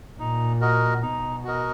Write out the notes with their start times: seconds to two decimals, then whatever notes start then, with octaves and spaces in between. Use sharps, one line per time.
0.19 A#2 D#4
0.61 F#4 A#4 D#5
1.02 B2 D#4
1.44 F#4 A#4 D#5